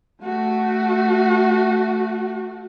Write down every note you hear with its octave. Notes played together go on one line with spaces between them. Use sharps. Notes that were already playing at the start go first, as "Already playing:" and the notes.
A3 F#4